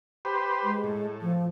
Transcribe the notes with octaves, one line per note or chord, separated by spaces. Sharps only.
G4 B4 C5
G#3
A2
F3